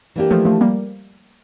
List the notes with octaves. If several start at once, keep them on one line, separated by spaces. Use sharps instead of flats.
E3 A#3 D4 G4
F3 A3
F3 A3
G3 A#3